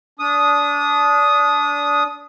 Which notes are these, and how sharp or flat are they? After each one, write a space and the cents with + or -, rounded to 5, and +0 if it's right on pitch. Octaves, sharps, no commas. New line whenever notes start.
D4 -25 D#6 +0